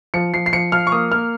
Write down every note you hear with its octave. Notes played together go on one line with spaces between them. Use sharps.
F3 C#7
F3 C7
C7
F3 C#7
F3 F6
C#6
A#3 D#6
A#3 F6